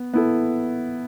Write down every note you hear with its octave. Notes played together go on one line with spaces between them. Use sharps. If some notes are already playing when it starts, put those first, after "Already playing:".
Already playing: B3
B3 E4 A4